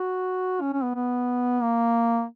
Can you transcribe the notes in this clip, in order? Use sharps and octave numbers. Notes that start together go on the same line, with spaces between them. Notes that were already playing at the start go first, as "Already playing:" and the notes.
Already playing: F#4
C#4
C#4
B3
B3
A#3